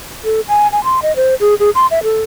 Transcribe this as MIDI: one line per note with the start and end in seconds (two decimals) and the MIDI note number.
0.24 0.41 69
0.48 0.68 80
0.72 0.83 80
0.84 1.02 84
1.02 1.15 75
1.16 1.35 72
1.40 1.54 68
1.60 1.70 68
1.75 1.86 84
1.91 2.03 76
2.03 2.22 69